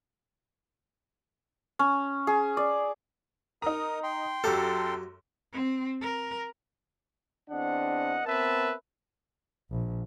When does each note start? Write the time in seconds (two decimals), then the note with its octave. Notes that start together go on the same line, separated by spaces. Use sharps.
1.79 C#4
2.27 G#4
2.57 D5
3.62 D#4 A#4 A#5 D#6
4.03 G5 C6
4.44 F#2 F#3 G4 A4 F5
5.53 C4
6.01 A#4
7.50 E2 C4 D4 D#5 F#5
8.25 B3 C4 A#4 B4 E5 A5
9.71 A#1